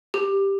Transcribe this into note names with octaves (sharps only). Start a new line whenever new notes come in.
G4